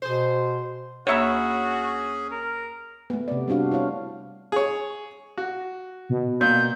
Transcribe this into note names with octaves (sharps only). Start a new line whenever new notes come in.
B2 G#4 C5
D2 A#3 C#4 F#4 G#4 C#5 E5 B5
A#4
A3 B3
C3 D5
G3 C4 D4 F#4 F5
E4 C5 C#5 F5
G#4 C#5
F#4
B2
A#2 G6